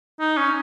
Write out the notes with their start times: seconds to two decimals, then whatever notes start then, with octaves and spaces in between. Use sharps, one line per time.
0.20 D#4
0.37 C#4